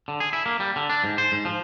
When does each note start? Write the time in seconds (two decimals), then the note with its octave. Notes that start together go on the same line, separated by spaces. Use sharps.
0.08 D3
0.20 G#4
0.33 E4
0.46 A#3
0.60 G3
0.76 D3
0.89 D4
1.04 G#2
1.18 C5
1.32 G#2
1.45 F3